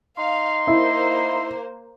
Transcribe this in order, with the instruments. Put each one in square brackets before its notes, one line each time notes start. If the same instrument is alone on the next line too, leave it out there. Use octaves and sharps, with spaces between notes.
[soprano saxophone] D#4 [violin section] F5 [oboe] C6
[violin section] A#3 C5 [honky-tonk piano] E4